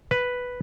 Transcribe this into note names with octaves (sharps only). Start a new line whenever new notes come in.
B4